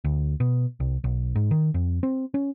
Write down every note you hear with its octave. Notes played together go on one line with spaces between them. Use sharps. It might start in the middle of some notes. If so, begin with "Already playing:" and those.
D2
B2
C2
B1
G#2
D#3
F2
C4
C#4